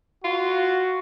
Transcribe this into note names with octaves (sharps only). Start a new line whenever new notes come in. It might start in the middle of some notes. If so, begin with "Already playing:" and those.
F4 F#4